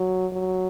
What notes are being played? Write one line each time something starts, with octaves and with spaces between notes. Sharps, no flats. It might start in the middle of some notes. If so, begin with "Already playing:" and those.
Already playing: F#3
F#3